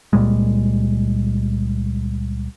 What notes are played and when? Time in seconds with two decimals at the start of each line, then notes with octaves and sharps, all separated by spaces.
0.13 C#2 A#2 G3 G#3